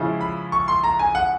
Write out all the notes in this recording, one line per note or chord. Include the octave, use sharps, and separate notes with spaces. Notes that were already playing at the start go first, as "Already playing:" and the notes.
Already playing: C#3 F3 G#3 C#4 E4
B5
C#6
C6
A#5
G#5
F#5